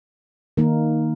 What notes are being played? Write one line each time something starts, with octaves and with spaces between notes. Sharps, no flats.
D#3 A#3 D#4 A#4